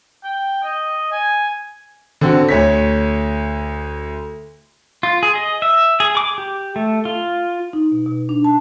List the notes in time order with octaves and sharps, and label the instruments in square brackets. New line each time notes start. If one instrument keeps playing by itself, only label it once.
[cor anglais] G5
D#5
G#5
[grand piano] D3 C4 F#4
D2 C#5 B6
[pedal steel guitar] F4
G#4
D#5
E5
G#4
D6
G4
A3
F4
[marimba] D#4
B2
B2
D4
A5